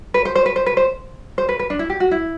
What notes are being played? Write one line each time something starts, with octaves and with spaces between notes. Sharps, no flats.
B4
C5
C5
B4
C5
B4
C5
C5
B4
B4
D4
E4
G4
F#4
E4